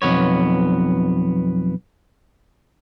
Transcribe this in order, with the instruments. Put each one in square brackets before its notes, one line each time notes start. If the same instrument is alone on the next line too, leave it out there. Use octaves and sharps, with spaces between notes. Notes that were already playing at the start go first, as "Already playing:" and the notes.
[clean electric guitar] B1 F2 A#2 B3 C#5